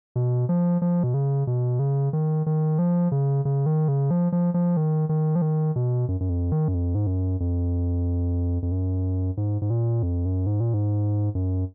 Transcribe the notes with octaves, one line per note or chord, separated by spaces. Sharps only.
B2
F3
F3
B2
C#3
B2
C#3
D#3
D#3
F3
C#3
C#3
D#3
C#3
F3
F3
F3
D#3
D#3
F3
D#3
B2
F#2
F#2
F2
D#3
F#2
F2
G#2
F#2
F2
F2
F#2
G#2
G#2
A#2
F2
F#2
G#2
A#2
G#2
F#2